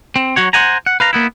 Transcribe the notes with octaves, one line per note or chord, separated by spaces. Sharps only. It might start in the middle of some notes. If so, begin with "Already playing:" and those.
C4
F#3 F#4 C#5
C5 D5 F#5 G#5 A#5
F#5
B4 F5 A#5
A#3 B3 E4